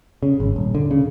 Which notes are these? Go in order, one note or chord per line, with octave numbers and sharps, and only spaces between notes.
C#3
G#1
D#1
D3
C#3